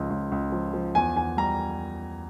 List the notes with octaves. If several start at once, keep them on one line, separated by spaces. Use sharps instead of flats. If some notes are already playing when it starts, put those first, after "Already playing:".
Already playing: C#2 F3
C#2
C#2
F3
F3
E2 G#5
E2 G#5
G3 A#5